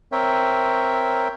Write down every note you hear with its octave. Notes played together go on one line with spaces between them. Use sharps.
C4 A#4 C#5 E5 G5